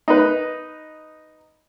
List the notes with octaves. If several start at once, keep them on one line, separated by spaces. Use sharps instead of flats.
D#4 B4